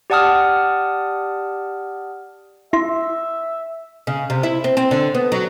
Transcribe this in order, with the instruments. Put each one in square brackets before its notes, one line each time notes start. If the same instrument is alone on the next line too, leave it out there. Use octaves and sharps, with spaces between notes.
[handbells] G4 D5 F#5 A5 D#6 F6
[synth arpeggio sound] E4 C6 [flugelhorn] E5
[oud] C#3
C3
E4
C4
C4
D3
B3
F#3